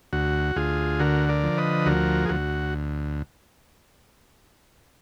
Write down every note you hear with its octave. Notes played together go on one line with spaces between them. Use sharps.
D2 F#4
D2 F4 G#4
D3 F#4 A#4
A#4 D5
F3
B4 D#5
D2 F#4 A#4
G#4
D2 F#4